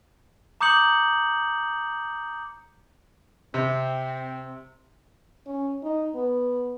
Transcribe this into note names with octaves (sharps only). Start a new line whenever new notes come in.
A#5 D6 D#6 G6 C#7 F#7
C3 C4
C#4
D#4
B3